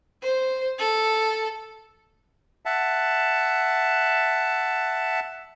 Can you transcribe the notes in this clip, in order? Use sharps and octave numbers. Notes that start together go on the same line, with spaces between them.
C5
A4
E5 F#5 A5